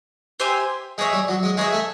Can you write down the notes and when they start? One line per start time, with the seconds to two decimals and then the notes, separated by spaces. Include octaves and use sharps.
0.40 G4 C5 E5 G#5
0.98 G#3 G#4 C#5 E5
1.13 G3
1.28 F#3
1.43 G#3
1.57 G#3 G#4 C#5 E5
1.73 A3